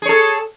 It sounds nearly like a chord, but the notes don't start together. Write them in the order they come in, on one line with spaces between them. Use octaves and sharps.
G#4 C#5 A4